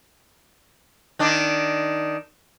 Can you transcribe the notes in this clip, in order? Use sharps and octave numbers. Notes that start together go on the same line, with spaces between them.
D#3 D4